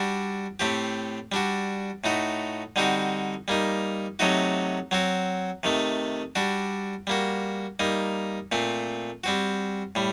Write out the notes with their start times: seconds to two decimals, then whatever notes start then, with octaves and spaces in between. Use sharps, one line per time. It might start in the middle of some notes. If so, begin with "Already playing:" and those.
Already playing: G3 D4 F#4
0.60 A2 A3 C4 G4
1.32 G3 D4 F#4
2.04 A2 A3 D#4 F#4
2.76 D3 G3 C4 D#4 F#4
3.48 G3 A#3 D#4
4.19 C3 F#3 A3 D#4 F#4
4.91 F#3 C4 F#4
5.63 C3 D#3 A3
6.35 G3 D4 F#4
7.07 G3 A#3 F#4
7.80 G3 A#3 D#4
8.52 A#2 A3 C4
9.24 G3 C4 F#4
9.95 A2 G3